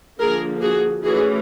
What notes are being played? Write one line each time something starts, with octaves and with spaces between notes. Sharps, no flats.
D3 F3 A#3 G#4 A#4
F#4 G#4
E3 A3 C#4 F#4 G#4